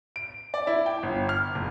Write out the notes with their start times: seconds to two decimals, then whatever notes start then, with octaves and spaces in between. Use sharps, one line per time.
0.16 D7
0.54 D5
0.67 E4
0.86 G5
1.03 G1
1.29 F6
1.55 F#1